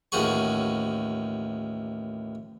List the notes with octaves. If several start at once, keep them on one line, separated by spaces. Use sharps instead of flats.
A1 D#2 F3 F#4 G#4 C#6